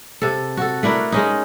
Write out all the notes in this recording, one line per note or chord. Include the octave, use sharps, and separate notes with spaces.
C3 A4
F#4 A4
A3 D4 E4 A#4
G#3 C#4 D#4